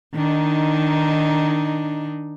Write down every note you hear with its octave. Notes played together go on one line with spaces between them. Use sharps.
D#3 D4 D#4